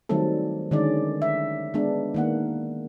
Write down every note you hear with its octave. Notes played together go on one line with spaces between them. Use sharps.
D#3 F#3 G3 A3 C4 A4
D3 D#3 G#3 C#4 D5
E5
G#3 B3 D4
D#3 A#3 F#5